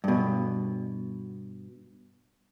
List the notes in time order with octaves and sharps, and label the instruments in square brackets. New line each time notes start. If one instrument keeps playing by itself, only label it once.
[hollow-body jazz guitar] G2 B2